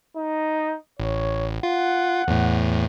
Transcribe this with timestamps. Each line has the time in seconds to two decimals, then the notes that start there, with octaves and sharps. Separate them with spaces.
0.17 D#4
1.00 A1 C#5
1.63 F4 F#5
2.28 E2 A2